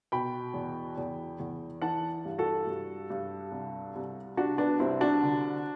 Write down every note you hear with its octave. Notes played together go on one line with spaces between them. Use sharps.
B2 G5 B5
E2
E2
E2
E3 F#5 A5
G2
F#4 A4
G2
G2
C2
C2
C2 D4 F#4
B3 D4
C2 C4 E4
D4 F#4
D3